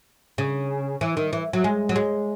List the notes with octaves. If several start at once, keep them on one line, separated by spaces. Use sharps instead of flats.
C#3
E3
D#3
E3
F#3
G#3
F#3
G#3